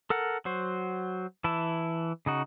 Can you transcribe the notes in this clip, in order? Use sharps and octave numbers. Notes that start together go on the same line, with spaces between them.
A4 A#4 F#5
F#3 F#4 C5
E3 E4 A5
C#3 D#4 F#4